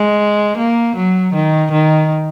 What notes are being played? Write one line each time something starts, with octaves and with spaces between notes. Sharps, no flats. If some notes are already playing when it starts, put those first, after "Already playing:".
Already playing: G#3
A#3
F#3
D#3
D#3